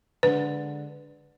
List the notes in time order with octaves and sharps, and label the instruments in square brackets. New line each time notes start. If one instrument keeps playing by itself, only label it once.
[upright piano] D3 G#3 D4 [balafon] B4